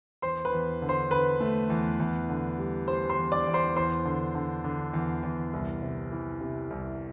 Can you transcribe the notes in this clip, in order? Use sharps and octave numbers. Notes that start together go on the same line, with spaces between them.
E2 C5 C6
B4 B5
E2
D3
C5 C6
D3 B4 B5
A3
E2
E2
D3
G3
G3 C5 C6
C5 C6
E2
D5 D6
E2
C5 C6
E2 C5 C6
D3
D3
D3
E2
E2
C2
C3
E3
C3
C2